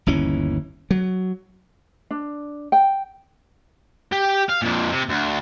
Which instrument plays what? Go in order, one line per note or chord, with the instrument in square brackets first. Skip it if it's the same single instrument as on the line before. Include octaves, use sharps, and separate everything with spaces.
[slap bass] G1 D#2 E3 C#4
F#3
[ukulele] D4
G5
[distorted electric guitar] G4
F5
F2 A#2
C3
D2